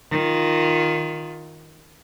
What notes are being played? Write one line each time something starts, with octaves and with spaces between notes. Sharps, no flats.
D#3 F4